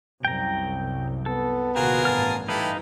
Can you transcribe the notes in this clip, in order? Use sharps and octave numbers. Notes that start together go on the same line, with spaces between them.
C2 F#2 G5 A#5
B3 A4
A#1 D#2 C3 F4 F#4 G#4 A#4
A1 G2 G#5 A5 F6
G2 E3 D#4 E4 G4 A4 B4 F5